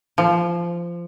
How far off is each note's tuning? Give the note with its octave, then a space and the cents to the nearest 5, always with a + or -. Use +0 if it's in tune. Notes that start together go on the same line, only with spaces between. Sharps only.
F3 -20